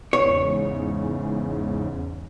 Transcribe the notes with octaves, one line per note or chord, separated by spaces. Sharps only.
E2 G#2 C#3 C#5